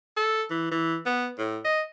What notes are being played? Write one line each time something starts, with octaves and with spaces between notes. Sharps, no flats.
A4
E3
E3
B3
A2
D#5